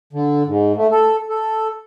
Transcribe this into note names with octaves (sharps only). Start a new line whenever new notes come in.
D3
G#2
A3
A4
A4